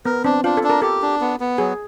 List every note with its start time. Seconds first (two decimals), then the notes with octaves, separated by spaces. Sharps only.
0.05 B3 A#4
0.24 C4 D4
0.44 D4 F4
0.57 A4
0.63 D4
0.70 A#4
0.82 G4 A4
1.02 D4
1.21 B3
1.40 B3
1.58 F#3 G#4